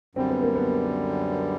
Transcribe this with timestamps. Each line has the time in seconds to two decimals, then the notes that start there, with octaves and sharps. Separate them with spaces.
0.15 F#2 D3 G3 C4
0.30 B3
0.43 A#3
0.55 B3